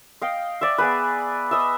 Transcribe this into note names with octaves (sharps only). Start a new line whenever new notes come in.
D#5 F5 G5
D5 E5
B3 G#4 B4
D#5 E5